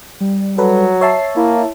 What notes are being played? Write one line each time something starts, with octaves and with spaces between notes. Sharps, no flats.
G3
F#3 A4 B4
C#5 E5 A5 C7
A#3 E4